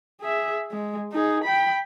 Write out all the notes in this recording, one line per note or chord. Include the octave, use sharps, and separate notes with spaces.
G#4 E5
G#3
D#4 G#4
G5 B5